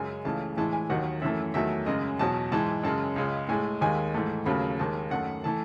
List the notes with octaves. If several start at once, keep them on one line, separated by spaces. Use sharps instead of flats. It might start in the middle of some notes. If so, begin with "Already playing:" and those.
Already playing: F#2 C#3 G#3 G#5
C#2 C#3 E3 A3 A5
A2 E3 G#3 A5
G#5
D#2 D#3 F#3 F#5
F#2 E3 A3 E5
E2 D#3 F#3 A3 E5
F#2 C#3 G#3 D#5
E2 B2 F#3 A5
G#2 E3 G#3 A5
F#2 C#3 G#3 A5
C#2 C#3 G#3
A2 G#3 G#5
D#2 D#3 G#3 G#5
G#2 E3 A3
D#2 C#3 F#3 A3 B5
D#2 D#3 G#3 A5
F#2 D#3 A3 F#5
E3 A3 A5